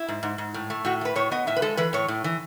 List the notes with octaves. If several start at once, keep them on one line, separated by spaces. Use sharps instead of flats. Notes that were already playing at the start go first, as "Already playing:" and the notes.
Already playing: E4
G#2
G#2
G#2
A2
A3
A2 F#4
A3 B4
A2 C#5
B3 D#5
A2 E5
B4
G#3 A4
E3 B4
A2 C#5
A2
E3